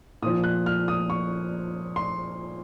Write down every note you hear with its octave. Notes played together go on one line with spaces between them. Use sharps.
A#2 F3 D#6
F#6
F6
D#6
C#6
C6